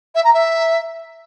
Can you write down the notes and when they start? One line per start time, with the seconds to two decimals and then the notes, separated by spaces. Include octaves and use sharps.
0.15 E5
0.24 A#5
0.34 E5